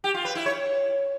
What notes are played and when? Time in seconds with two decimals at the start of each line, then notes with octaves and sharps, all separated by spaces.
0.04 G4
0.14 F4
0.25 B4
0.35 E4
0.46 C#5